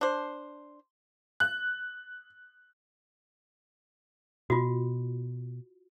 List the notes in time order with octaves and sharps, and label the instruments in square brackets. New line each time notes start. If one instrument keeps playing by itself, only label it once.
[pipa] D4 C5
[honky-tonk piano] F#6
[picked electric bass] B2 [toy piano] F4 F#4